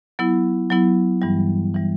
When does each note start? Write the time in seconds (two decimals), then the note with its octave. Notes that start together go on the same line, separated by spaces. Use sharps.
0.19 F#3 B3 E4
0.70 F#3 B3 E4
1.22 G2 E3 G3
1.75 E3 G3